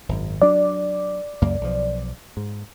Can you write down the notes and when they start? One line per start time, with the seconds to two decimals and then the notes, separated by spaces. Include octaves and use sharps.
0.09 G#1 F#2
0.42 F#3 D4 D5
1.42 C#2 F#2 A#3
1.61 B1 F3
2.37 G#2